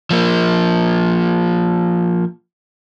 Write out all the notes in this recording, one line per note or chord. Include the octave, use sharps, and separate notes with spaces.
F3 A#3